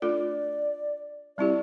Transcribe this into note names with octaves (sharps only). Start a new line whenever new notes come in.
A3 D4 F4 A4 D5
G3 C4 E4 G4 D5